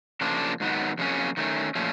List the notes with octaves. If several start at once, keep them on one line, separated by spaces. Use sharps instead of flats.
C#3 F3 A#3 D4
G#2 D#3 F#3 B3
F2 C#3 F#3 A#3 C#4
D#3 F#3 A3 C#4
A#2 F3 A3 C#4